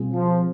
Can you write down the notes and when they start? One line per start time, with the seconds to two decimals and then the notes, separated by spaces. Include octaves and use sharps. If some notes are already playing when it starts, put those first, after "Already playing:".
Already playing: B2 G3 C4 F4 G#4
0.13 F3